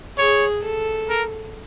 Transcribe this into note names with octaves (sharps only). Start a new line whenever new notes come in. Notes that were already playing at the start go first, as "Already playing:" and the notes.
G#4 C#5
A4
A#4